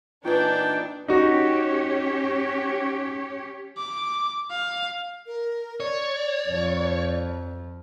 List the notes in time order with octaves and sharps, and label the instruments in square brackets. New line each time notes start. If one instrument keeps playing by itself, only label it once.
[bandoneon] A#2 E3 D#4 [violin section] D4 [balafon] F4 B4 [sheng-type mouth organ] G5
[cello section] C#4 G4 C#5 [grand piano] D#4 F#4
[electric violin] D6
F5
[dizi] A#4
[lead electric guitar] C#5 [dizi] D5
[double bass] F2 F3